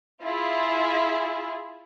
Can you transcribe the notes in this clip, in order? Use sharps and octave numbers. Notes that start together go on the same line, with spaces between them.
E4 F4 G#4